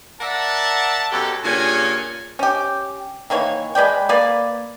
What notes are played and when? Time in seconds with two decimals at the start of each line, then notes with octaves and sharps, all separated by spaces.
0.21 A#4 D5 E5 F#5 A5
1.12 F#2 B2 G4 A4
1.44 G2 A#2 C#3 C#4 G#5
2.39 C#4 G4
3.30 D#3 E3 A#3 C#5
3.75 G#3 B4 D5 G5
4.09 A#3 B4 D5